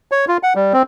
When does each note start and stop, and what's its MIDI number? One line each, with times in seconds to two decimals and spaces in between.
0.12 0.25 73
0.28 0.37 65
0.43 0.53 78
0.56 0.73 55
0.73 0.83 60